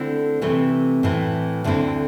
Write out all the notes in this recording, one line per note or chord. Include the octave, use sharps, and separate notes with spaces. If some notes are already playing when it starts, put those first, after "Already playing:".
Already playing: D3 A3 C4 E4
C3 E3 A3 C4
A2 E3 C4 E4
D2 D3 A3 C4 E4